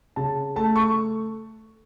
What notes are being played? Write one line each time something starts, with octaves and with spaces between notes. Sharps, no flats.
C#3 A5
A3 A5
C#6